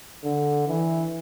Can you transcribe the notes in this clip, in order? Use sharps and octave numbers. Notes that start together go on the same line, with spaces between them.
D3
E3